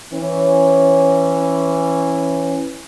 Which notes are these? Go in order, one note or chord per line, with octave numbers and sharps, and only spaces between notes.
E3 C#4